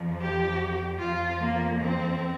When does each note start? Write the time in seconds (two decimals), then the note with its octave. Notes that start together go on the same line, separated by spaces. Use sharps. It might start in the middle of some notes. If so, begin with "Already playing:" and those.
Already playing: F2 F3
0.20 G4
1.00 F2 F3 F4
1.40 A#3
1.80 C4